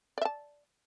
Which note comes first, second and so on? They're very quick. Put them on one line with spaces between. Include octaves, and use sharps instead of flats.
D5 E5 A5